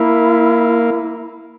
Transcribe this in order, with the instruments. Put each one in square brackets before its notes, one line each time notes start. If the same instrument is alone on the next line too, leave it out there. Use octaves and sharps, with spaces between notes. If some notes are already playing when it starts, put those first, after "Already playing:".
Already playing: [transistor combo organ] A#3 [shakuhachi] E4